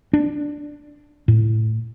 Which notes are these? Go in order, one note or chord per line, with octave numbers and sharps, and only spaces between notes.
D4
A2